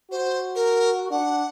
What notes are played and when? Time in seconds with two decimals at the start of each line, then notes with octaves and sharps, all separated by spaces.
0.11 F#4 C5
0.55 A#4
1.11 D4 F#5